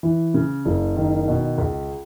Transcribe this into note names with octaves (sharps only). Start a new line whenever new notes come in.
E3
C#3
F#1
D#3
B2
C#2